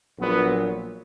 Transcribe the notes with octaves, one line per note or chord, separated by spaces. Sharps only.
A#1 A#2 F#3 B3